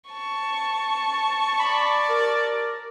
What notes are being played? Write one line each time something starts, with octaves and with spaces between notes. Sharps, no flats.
A5 C#6
D5 B5
A#4